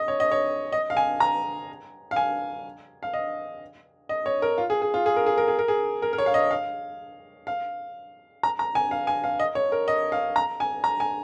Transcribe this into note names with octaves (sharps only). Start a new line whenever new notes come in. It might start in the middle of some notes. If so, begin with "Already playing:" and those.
Already playing: D#5
C#5
D#5
C#5
D#5
F5
G#5
A#5
F5
G#5
F5
D#5
D#5
C#5
A#4
F4
G#4
G#4
F4
G#4
A#4
G#4
A#4
G#4
A#4
G#4
A#4
A#4
C#5
F5
D#5
F5
F5
A#5
A#5
G#5
F5
G#5
F5
D#5
C#5
A#4
D#5
F5
A#5
G#5
A#5
G#5